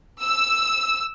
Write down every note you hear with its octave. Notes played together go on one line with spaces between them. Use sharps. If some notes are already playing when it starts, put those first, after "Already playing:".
E6